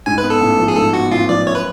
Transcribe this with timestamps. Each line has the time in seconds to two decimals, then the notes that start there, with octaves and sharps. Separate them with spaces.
0.06 G#2 G#5
0.18 B4
0.23 B3
0.30 A4
0.41 A1
0.59 F3
0.68 G#4
0.76 G#2 A4
0.93 B3 F#4
1.11 A1 F4
1.29 F3 D5
1.47 F#2 C#5
1.55 B4